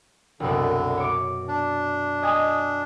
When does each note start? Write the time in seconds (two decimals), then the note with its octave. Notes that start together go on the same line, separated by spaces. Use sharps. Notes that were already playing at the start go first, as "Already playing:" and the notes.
0.40 C2 F#2 B2 D3
0.97 C#5 D6
1.48 D4
2.22 D#5 G#5 D#6